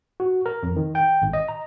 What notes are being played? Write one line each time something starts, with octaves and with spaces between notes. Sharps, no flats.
F#4
A#4
F2
D#3
G5
G#1
D#5
A#5